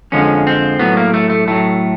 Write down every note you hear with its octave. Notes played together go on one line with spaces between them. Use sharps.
F2 D3 F3 G#3 C#4
C4
A2 F#3 B3
A#3
A3
A3
A2 F#3 A3